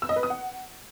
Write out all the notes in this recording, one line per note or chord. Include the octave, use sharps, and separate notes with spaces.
E6
D#5
B4
D#6
F#5